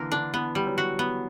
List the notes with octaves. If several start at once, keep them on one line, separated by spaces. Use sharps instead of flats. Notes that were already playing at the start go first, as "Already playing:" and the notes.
Already playing: D3 E3 A#3 A#4
D3 D4
E3 B3
G3
F#3
F#4
B3